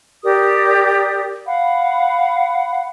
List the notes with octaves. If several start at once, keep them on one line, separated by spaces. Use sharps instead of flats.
G4 A#4 D5 D#6
F5 F#5 B5